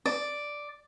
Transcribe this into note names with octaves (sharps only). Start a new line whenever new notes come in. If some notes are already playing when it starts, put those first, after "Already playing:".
D5